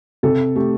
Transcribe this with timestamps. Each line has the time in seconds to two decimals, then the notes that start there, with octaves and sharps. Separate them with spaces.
0.23 C3 A4
0.56 A3 G4